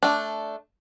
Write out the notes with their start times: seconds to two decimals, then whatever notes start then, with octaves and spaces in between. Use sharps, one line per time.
0.03 A3 D4